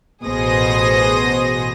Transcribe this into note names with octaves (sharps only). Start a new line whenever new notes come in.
A1 B2 G#4 C5 D#6 A#6